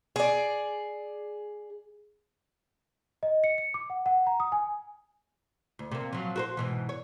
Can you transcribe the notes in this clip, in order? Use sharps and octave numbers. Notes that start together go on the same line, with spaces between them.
G#4 D5
D#5
C#7
C#7
D6
F#5
F#5
A#5
D#6
G#5
D2
C3 A#3
F3 F#3
F#4 A#4 C5
G#2 B2 E3
C#5